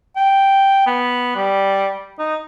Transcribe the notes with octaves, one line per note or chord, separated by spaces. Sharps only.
G5
B3
G3
D#4